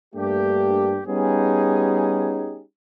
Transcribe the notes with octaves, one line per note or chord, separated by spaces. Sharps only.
G2 A3 A#3 D4 G4
G3 B3 C#4 D#4 G4 G#4